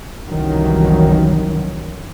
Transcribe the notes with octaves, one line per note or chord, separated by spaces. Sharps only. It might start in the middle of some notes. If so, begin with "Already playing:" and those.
F#1 C2 D#3 E3 F#3 C#4